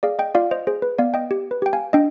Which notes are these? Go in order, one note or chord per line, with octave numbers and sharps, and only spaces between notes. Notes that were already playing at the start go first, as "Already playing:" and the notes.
G#4 D5 F5
D#5 G5
F4 D5 F5
C5 D#5
G#4 C5
B4
B3 D5 F5
D#5 G5
G4
B4
G4 G5
F5 G#5
D4 D#5 G5